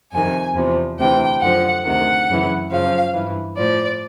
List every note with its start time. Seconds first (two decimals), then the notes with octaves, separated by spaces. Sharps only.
0.12 F2 C3 D#3 G#5
0.55 E2 C3 F3
0.98 D2 C3 E3 G5
1.41 F#2 D3 F3 F#5
1.84 D2 C3 D#3 F#5
2.28 F#2 C#3 E3
2.70 F#2 C#3 F3 F5
3.14 G2 E3
3.57 A2 F3 D5